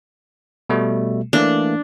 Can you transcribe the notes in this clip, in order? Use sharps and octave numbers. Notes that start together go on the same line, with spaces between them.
B2 G3 A3
E3 A3 A#3 D4